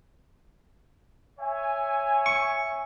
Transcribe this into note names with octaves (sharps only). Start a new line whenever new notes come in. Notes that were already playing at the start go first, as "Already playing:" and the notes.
C#5 E5 G#5
C#6